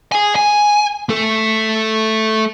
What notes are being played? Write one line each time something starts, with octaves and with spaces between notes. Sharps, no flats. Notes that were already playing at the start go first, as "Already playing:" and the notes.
G#4 G#5
G#5
A3 A4